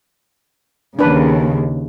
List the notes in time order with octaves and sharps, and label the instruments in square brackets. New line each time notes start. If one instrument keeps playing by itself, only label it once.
[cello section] D#2 C#3 [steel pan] D4 B4